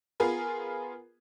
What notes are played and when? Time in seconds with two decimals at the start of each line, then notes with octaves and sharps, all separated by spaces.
0.20 B3 F4 G#4 A#4 B4